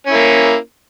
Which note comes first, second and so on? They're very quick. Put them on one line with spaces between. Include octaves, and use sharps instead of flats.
C#4 E4 A#3